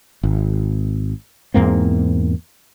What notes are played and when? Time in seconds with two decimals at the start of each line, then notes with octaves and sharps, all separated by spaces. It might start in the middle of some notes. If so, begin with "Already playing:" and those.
0.23 G#1
1.54 E2 G#2 A#3 C4